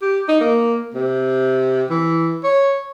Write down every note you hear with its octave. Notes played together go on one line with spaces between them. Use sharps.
G4
D#4
A#3
C3
E3
C#5